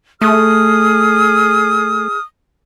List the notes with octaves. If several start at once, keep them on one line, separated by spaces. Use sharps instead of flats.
A3 G#4 D#6 F6